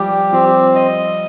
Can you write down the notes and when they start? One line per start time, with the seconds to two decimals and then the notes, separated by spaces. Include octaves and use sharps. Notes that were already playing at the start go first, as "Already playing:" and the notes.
Already playing: F3 G3 G4
0.32 F3 C4
0.75 D#5